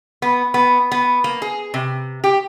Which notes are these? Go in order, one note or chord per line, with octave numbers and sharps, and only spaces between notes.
B3
B3
B3
A#3
G#4
C3
G4